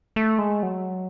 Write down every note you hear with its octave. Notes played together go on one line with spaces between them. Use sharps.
A3
G#3
F#3